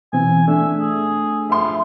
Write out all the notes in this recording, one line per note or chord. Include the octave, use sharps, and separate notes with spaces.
B2 E3 C4 G#5
A3 D4 A4 E5
G#4
F3 E5 C6